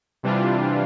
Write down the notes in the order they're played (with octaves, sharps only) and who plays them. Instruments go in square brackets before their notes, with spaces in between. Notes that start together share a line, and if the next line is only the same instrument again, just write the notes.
[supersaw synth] C3 E3 G3 D4 F4